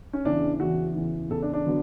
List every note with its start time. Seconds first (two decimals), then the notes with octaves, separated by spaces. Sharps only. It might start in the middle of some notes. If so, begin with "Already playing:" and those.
0.13 C#4
0.25 E2 C#3 E3 D4
0.60 E2 C#3 E3 F#4
0.95 E2 C#3 E3
1.30 E2 C#3 E3 A4
1.42 D4
1.53 D4
1.66 D3 F#3 B3